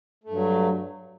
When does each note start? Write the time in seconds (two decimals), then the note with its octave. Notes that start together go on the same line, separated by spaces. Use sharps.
0.24 A3
0.29 G2
0.34 F#3